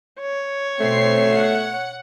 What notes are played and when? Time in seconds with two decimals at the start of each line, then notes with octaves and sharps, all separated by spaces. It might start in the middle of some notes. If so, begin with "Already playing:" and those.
0.21 C#5
0.80 B2 A3 C4 C7
1.37 F#5